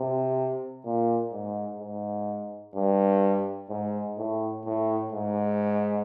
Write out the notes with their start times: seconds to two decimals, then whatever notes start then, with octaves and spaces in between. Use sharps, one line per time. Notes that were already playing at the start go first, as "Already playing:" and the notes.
Already playing: C3
0.85 A#2
1.32 G#2
1.80 G#2
2.75 G2
3.70 G#2
4.17 A2
4.65 A2
5.12 G#2